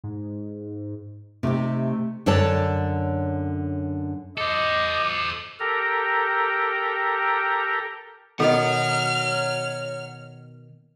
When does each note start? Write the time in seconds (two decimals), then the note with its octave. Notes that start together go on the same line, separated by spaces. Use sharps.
0.04 G#2
1.43 C3 A3 D#4 G4
2.26 F#2 D3 A4 C#5 D5 A5
4.38 A4 C5 D#5 D6
5.60 G4 A4 A#4 G5 A#5
8.40 B2 D#3 A4 C#5 D#5 F#5 F6